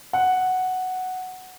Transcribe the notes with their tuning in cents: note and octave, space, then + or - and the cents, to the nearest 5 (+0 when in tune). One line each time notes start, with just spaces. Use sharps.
F#5 +0